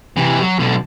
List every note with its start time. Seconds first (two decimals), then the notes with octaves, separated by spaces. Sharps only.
0.17 C3 E3
0.41 F#3
0.59 B1 D3